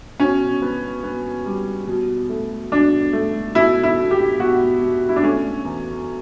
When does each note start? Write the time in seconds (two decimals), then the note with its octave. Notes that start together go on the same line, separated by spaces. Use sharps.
0.20 B2 C#4
0.62 B3
1.03 B3
1.46 G3
1.87 B2
2.29 A3
2.72 B2 D4
3.13 A3
3.55 B2 E4
3.83 E4
3.98 B2
4.11 G4
4.39 B2 F#4
4.81 B2
5.09 E4
5.16 D4
5.23 A3 C#4
5.65 E2